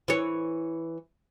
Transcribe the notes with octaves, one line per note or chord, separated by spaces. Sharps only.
E3 C#5